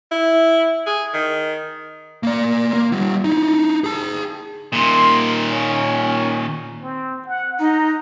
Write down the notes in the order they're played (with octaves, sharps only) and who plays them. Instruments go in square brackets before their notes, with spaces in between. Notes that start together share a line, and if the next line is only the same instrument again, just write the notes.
[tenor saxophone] E4
G#4
D#3
[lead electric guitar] A#3 D5
A#3
G3 F4
D#4 E4
G#4 A5
[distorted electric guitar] A#2 D#3 [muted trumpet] C6
[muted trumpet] C#4
C4
F#5
[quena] D#4 [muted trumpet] A#5